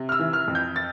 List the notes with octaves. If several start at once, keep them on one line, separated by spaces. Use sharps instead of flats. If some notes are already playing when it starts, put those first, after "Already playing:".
Already playing: C3
F6
E6
E3
F6
F2
G6
A6